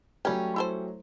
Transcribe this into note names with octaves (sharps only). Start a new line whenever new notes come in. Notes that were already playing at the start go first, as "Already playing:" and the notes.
F#3 G3 A3 C#4 G4
E4 A4 C5